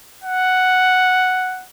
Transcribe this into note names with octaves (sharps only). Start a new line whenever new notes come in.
F#5